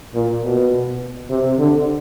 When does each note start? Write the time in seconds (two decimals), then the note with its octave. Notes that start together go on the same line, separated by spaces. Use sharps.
0.14 A#2
0.43 B2
1.30 C3
1.59 D3